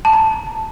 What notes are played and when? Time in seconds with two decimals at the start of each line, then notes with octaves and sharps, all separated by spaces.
0.05 A5
0.13 A#5